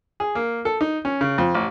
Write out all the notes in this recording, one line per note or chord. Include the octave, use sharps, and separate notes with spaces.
G#4
A#3
A4
D#4
C#4
C#3
F2
A1